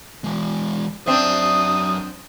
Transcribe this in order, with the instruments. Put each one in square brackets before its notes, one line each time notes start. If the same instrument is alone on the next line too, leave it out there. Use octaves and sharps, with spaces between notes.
[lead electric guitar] E3 G#3
[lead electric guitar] F#2 E5 [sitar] C4 D4 [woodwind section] D#6